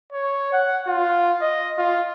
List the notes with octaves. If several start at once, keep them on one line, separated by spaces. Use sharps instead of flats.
C#5
F#5
F4
D#5
F4